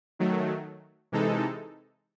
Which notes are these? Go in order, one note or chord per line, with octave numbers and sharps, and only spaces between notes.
D#3 F#3 A3
C3 E3 G#3 D#4 A4